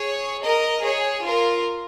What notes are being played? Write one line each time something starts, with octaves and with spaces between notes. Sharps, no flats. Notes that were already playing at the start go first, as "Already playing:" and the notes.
Already playing: G#4 C#5
A#4 D#5
G#4 C#5
F4 A#4